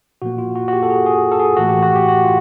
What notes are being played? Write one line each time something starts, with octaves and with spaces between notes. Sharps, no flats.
A#2 F3 A#3 F#4
F4
F#4
F#4
G4
A4
G#4
G#4
A4
G#4
A2 E3 A3 F#4
G4
F#4
G4
F#4
F4